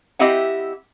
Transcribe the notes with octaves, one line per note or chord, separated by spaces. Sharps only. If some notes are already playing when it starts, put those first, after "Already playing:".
C4 E4 G4 D#5 E5 F#5